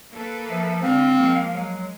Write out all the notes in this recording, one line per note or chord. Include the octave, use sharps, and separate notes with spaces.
A#3 A4 B4
F3 E5
D3 G#3 C4 F5
F3 G#3 A#3
F#3 G#3